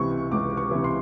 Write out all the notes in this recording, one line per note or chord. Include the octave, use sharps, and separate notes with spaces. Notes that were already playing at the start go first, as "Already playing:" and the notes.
Already playing: C#2 C3 E3 C#6
C#2 D6
C#6
C3 E3
C6